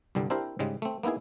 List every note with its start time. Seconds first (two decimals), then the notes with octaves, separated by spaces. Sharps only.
0.15 C2 G2 D3 G3
0.30 C4 D4 E4 G4 A#4 C5
0.59 G#2 C#3 G3 G#3
0.82 A3 C4
1.03 A#3 B3 D#4 E4 G#4